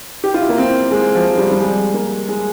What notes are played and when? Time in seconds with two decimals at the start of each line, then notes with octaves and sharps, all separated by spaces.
0.24 G4
0.34 F4
0.41 E4
0.49 A#3
0.58 C4
0.91 G#3
1.15 F3
1.38 G3
1.51 G3
1.60 G#3
1.94 A#3
2.29 G#3